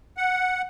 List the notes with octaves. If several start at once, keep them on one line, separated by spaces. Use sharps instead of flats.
F#5